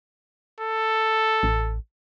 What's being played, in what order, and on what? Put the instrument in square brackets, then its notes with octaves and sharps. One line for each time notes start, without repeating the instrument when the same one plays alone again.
[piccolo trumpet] A4
[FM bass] A1